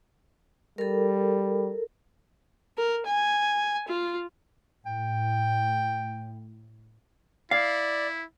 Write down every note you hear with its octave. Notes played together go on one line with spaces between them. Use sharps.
G3 A4 A#4
A#4
G#5
F4
A2 G5
E4 D5 F5